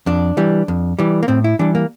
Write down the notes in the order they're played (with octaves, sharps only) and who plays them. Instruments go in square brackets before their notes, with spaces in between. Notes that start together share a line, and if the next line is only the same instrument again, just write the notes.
[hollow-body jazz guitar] F2 D4
E3 G3
F2
E3 G3
A#3
A2 C4
E4
E3 G3 D4
A#3